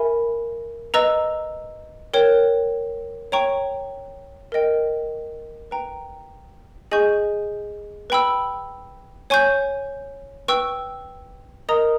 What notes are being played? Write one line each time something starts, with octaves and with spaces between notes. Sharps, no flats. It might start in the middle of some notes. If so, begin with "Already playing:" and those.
Already playing: A#4 E5 G#5 B5
B4 D#5 A#5 E6
A#4 C#5 G5
C#5 G5 A#5 C#6
A#4 D#5 G5
B4 G5 A#5
G#4 D#5 G#5 C#6 G6
B4 G5 B5 E6
C#5 G#5 C#6 G6
B4 G5 C#6 E6
A#4 D#5 A#5 D#6